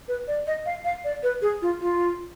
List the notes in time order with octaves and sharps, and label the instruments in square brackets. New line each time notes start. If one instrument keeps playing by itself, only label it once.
[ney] B4
D5
D#5
F5
F5
D5
B4
G#4
F4
F4